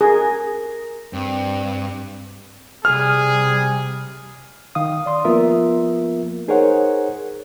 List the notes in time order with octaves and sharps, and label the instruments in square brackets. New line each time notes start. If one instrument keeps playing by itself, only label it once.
[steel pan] G#4 [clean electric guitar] A#4
[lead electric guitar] G2 [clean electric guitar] C4
[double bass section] C3 G3 [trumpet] G#4 [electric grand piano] F6
[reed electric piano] D#3 F5 D#6
D5 C6 D#6
F3 A#3 B3 F4 A#4 E5
D#4 G#4 A#4 C5 C#5 F#5